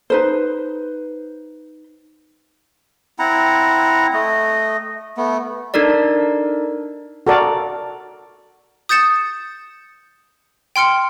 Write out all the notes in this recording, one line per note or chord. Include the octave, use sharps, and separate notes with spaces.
D#4 B4 C5
C4 E4 F#5 A#5
A3 D#5
A3 B3
D4 D#4 A4 A#4 D5
F#4 A4 A#4 D5
D#6 G6 A6 C#7 E7
G5 C6 F6 C#7